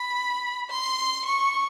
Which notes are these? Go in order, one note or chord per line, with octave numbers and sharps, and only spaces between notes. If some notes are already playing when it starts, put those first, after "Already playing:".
Already playing: B5
C6
C#6